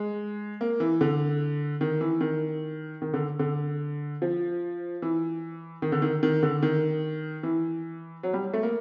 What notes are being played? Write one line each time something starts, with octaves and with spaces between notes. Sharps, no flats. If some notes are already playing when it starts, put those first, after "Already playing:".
Already playing: G#3
A#3
E3
D3
D#3
E3
D#3
D#3
D3
D3
F3
E3
D#3
D3
D#3
D#3
D3
D#3
E3
F#3
G3
A3
A#3